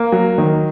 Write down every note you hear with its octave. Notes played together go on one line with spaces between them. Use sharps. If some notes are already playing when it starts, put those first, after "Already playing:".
Already playing: A#3
F#3
D#3